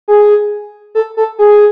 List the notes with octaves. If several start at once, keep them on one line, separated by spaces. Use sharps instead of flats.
G#4
A4
A4
G#4